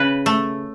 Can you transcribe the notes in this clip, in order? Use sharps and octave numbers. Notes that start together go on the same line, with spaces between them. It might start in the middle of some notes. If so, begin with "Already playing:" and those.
Already playing: C#3 B4
A3